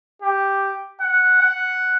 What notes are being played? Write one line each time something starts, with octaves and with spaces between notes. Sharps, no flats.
G4
F#5
F#5